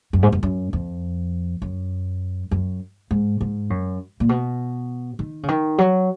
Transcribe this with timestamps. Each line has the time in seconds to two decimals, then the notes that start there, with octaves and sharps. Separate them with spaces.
0.13 F#2
0.23 G#2
0.32 F#2
0.43 F#2
0.73 F2
1.62 F#2
2.51 F#2
3.11 G#2
3.41 G#2
3.70 F#2
4.20 A#2
4.29 B2
5.19 D#3
5.43 C#3
5.48 D#3
5.78 F#3